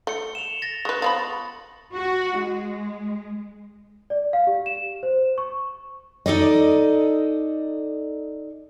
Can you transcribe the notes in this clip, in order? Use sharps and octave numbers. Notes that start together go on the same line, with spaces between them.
A3 C#7 G7
E7 F7
A6 A#6 F7
G#3 B4 C#6
F3 B3 B5 A6
F#4
G#3
D5
F5
G4
E7
C5
C#6
D#4 A4 D5 D#5